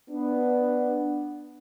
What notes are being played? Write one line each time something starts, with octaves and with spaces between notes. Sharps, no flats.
B3 D4